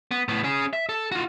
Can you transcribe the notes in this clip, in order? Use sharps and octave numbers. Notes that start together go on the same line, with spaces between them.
B3
A2 B3
C#4 G#4
E5
A4
F4 F#4